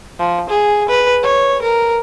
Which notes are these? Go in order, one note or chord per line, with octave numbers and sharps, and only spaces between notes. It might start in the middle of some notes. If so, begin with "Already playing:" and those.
F3
G#4
B4
C#5
A#4